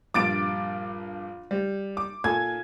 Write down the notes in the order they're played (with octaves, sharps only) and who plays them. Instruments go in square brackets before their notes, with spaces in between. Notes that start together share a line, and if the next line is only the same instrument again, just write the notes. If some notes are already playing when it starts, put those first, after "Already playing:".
[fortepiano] A#1 G2 [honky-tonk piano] D6 A6 D7
[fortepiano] G3
[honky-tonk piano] D6
[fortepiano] A#2 A4 G#5 [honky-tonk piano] G#6